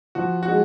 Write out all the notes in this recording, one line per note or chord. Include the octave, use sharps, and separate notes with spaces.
F3 F#4
F#4
G#3